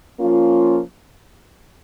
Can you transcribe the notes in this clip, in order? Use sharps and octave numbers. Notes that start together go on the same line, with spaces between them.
F3 A#3 C#4 F4